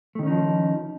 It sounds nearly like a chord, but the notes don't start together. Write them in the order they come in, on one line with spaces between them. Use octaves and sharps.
A3 D#3 C#4 D#4 F3